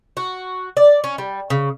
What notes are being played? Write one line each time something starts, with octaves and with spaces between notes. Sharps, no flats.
F#4
D5
C#4
G3
C#3